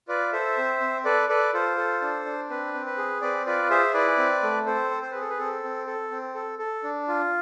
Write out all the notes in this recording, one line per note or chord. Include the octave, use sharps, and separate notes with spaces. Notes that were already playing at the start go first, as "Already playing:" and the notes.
F4 B4 D5
A4 C5 E5
C4
C4
A4 B4 D5
A4 B4 D5
F4 A4 C5
A4
D4
D4
C4 B4
C4
B4
G#4
C4 B4 D5
F4 B4 D5
G#4 C5 E5
E4 B4 D5
C4
A3
C4 A4 C5
C4
C5
G#4 B4
A4
B4
C4 A4
C4
A4
C4
A4
A4
D4
F4